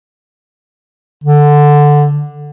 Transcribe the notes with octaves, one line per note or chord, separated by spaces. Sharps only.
D3